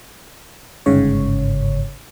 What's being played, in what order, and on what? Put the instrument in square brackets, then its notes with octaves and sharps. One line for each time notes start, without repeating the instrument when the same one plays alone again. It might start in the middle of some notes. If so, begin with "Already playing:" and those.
[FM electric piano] G1 G#2 C#3 C#5